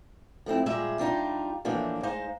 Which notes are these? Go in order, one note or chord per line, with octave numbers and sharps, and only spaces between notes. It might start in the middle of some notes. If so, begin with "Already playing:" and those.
F3 A3 C4 E4
A#2 G3 G#3 G#4 E5
G3 D4 D#4 F4
A2 E3 F3 A#3 D4
G#3 D#4 C5 F5